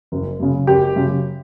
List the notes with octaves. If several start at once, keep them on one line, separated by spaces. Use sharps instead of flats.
F#1
F#2 C#3
F#1 G4
F#2 C#3